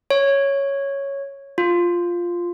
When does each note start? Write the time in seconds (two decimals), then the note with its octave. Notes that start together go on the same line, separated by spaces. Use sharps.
0.10 C#5
1.58 F4